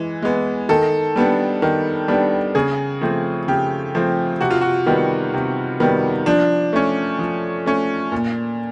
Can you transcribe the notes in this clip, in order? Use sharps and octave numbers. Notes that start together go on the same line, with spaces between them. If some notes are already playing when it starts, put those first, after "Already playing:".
Already playing: E3 G#3
G#3 B3
D#3 A4
G3 B3 D4
D#3
G3 B3 D4
C#3 G#4
F3 A3 C4
C#3 G4
F3 A3 C4
C3 F#4
F4
F#4
D#3 G3 B3
C3
D#3 G3 B3
F3 D4
A3 C#4
F3
A3 C#4
A#2